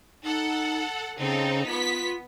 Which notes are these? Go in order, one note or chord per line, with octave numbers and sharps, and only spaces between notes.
D#4 A4 F#5
C#3 C4 D#4 A4
B3 F4 B6